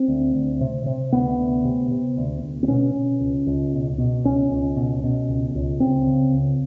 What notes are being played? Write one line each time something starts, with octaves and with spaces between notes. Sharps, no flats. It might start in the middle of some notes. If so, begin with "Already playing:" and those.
Already playing: C4
D2
D2
C3
C3
D2 B3
D2
C3
C3
D2
D2
C4
B2 C#4
B2
C#2
C#2
B2
B2
C#2 C#4
C#2
B2
B2
C#2
C#2
C#3 C4
C#3
C#2